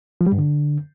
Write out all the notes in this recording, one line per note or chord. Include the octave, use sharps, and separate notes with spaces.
F3
G3
G2
D3